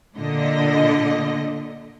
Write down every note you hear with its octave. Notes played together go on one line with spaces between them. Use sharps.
A#2 D3 D#5